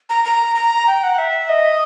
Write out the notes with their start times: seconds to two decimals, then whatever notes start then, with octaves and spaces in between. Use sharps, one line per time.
0.09 A#5
0.25 A#5
0.56 A#5
0.87 G5
1.03 F#5
1.18 E5
1.49 D#5